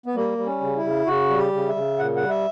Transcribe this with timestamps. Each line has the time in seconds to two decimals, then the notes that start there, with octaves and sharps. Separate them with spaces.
0.06 B3
0.15 G3 A#3
0.38 G3
0.46 C#4
0.61 C#3
0.76 E4
0.84 C#3
1.06 C#3 F#4
1.30 G3
1.37 G4
1.53 C#3
1.68 E5
1.75 C#3
1.99 A#2 F#5
2.16 F#5
2.22 G3
2.29 E5